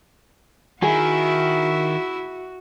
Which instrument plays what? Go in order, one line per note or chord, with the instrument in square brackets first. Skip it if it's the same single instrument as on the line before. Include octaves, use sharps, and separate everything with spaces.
[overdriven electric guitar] D#3 [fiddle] E4 E5 [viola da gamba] F#4 [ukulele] G#4